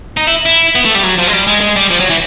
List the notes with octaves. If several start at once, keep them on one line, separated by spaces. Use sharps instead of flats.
D#4
E4
E4
B3
A3
G3
F#3
F3
G#3
G3
G#3
G#3
G3
F3
F#3
E3